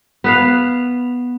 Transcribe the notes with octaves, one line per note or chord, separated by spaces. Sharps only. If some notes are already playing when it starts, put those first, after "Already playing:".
B3 B4 F5